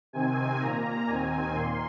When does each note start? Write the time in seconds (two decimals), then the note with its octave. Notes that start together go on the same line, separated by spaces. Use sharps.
0.13 C3 D#3 C4 G#5
0.60 A#2 A#3 A#5
1.07 D#2 D#3 C4 G#5
1.55 A#2 A#3 C6